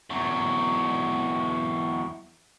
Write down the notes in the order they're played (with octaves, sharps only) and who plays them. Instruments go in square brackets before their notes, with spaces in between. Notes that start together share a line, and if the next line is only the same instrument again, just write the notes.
[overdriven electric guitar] E2 F#3